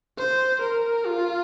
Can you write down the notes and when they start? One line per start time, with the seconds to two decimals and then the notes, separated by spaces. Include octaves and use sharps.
0.18 C5
0.61 A#4
1.06 F4